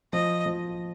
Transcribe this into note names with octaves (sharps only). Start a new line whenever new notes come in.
F3 D#5
F3